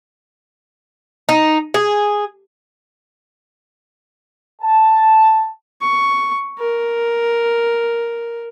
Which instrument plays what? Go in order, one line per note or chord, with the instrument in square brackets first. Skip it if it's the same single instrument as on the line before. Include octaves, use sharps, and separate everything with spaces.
[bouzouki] D#4
G#4
[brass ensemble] A5
[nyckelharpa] C#6
A#4